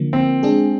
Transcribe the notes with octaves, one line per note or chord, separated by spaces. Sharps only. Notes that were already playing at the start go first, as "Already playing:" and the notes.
Already playing: D3 F3 A#3
C4
G#3 D4 G#4